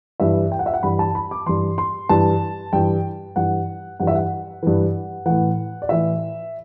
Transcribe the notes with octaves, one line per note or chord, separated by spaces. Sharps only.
G2 E3 E5
G5
F#5
E5
F#5
G2 E3 B5
A5
B5
D6
G2 E3 C6
C6
G2 E3 A5
G2 E3 G5
G2 E3 F#5
G2 E3 F#5
E5
F#5
G2 E3
A2 E3 F#5
D5
A2 E3 E5